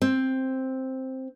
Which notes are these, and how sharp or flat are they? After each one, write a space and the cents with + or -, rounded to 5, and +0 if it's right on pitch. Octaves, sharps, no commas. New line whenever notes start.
C4 +5